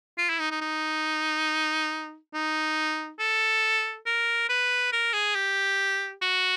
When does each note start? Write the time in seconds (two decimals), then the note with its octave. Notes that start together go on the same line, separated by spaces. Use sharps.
0.18 F4
0.29 E4
0.40 D#4
0.51 D#4
0.61 D#4
2.33 D#4
3.19 A4
4.06 A#4
4.49 B4
4.92 A#4
5.13 G#4
5.35 G4
6.22 F#4